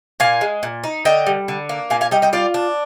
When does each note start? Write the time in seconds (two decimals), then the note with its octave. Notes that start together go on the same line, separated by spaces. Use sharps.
0.20 A#2 F5 G#5
0.41 G#3
0.63 A#2
0.84 D#4
1.05 D3 D#5 G5
1.27 G3
1.48 D3
1.69 A#3
1.90 A#2 F5 G#5
2.01 F5 G#5
2.11 G3 D#5 G5
2.22 D#5 G5
2.33 F4 D5 F5
2.54 D4